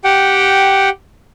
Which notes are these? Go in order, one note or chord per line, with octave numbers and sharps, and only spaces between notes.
G4 F#5 G5